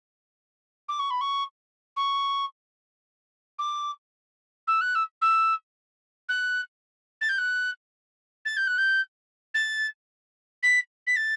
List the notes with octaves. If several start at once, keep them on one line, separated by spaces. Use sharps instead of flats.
D6
C#6
B5
C#6
C#6
D6
E6
F#6
E6
E6
F#6
A6
G6
F#6
A6
G6
F#6
G6
A6
B6
B6
A6